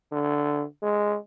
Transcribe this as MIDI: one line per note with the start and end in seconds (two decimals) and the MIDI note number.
0.12 0.64 50
0.83 1.16 56